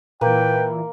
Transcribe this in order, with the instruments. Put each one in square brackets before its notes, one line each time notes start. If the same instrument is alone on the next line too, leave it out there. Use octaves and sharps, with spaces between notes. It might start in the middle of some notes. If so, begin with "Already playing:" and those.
[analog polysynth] A#2 E3 [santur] A#3 [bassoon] B4 [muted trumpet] G5